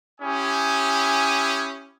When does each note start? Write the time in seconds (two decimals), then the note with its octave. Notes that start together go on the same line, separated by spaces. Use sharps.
0.21 C#4 E4 G4 G#5 D#6